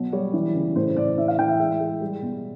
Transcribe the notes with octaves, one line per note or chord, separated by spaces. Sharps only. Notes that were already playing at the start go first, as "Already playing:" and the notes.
Already playing: B2 F#3
G3 C#5
E3
C#3
A2 C5
A2 D5
E3 E5
F5
E3 G5
E5
G#3 E5
G#3
G3
B2